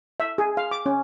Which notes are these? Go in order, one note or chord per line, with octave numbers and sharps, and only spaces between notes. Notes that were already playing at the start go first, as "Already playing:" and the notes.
E5
G#4
F5
D6
C#4